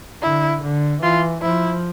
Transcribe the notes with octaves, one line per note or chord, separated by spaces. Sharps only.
D3 E4
D3
E3 F4
F3 E4